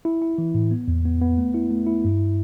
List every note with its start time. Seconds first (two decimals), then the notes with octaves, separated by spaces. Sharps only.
0.05 E4
0.22 E4
0.38 E3
0.54 A2
0.71 B3
0.88 E2
1.05 B3
1.21 B3
1.38 A3
1.54 E4
1.71 A3
1.87 E4
2.04 G2